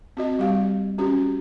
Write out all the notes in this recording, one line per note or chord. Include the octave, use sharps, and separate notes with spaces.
C4 F#4 D#5
G3 G4 F5
C#4 F#4 G4